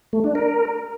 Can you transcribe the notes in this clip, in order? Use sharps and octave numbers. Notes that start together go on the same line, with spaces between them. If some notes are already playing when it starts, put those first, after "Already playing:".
A3
D4
A#4